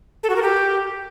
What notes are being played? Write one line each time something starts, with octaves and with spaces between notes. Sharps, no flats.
A4
F#4
A#4
G4